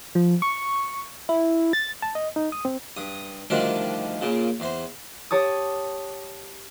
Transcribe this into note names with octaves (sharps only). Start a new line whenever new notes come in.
F3
C#6
E4
A6
A5
D#5
D#4
D#6
C4
G2 D#6
D2 D#3 F3 G3 D4 D5
A#2 C#3
E2 C5
G4 C#5 A5 D#6